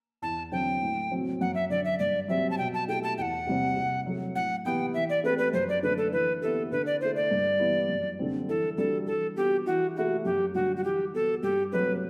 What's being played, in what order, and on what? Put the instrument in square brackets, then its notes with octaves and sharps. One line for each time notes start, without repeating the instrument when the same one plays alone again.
[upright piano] E2 [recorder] A5
[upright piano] D3 F#3 C4 [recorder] G5
[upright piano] A2
F#3 C4 F#4
[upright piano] F#2 [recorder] F#5
[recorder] E5
[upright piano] D3 F#3 [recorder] D5
[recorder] E5
[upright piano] G2 [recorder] D5
[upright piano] F#3 C4 G4 [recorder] E5
[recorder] A5
[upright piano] B2 [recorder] G5
[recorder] A5
[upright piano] A3 E4 G4 [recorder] G5
[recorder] A5
[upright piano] E2 [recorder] F#5 G5
[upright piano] C3 G3 C4
C3
F#3 A3
[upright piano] A2 [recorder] F#5
[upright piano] E3 B3 E4 G4 [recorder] G5
[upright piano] E3 [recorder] E5
[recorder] D5
[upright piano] A3 C4 G4 [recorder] B4
[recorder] B4
[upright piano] F#2 [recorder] C5
[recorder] D5
[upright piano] D3 A3 D4 [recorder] B4
[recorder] A4
[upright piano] E3 [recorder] B4
[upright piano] B3 E4 G4 [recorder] A4
[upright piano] D3 [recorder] B4
[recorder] D5
[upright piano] A3 E4 [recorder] C5
[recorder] D5
[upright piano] G2
E3 B3 E4 G4
F#2
D3 G3 C4
[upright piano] E3 [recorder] A4
[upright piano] G3 D4 F#4 [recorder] A4
[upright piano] E3 [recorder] A4
[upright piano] B3 F#4 [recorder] G4
[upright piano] E3 [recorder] F#4
[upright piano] A3 E4 G4 [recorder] F#4
[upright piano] F#2 [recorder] G4
[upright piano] D3 G3 [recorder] F#4
[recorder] F#4
[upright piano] E3 [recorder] G4
[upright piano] B3 F#4 [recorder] A4
[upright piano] G2 [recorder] G4
[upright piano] F#3 A3 C4 [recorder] B4